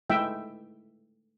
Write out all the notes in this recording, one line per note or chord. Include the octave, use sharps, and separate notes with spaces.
G#3 A3 E4 E5 G5